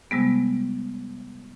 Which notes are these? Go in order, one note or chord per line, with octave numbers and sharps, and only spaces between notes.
C3 G3 G#3 B3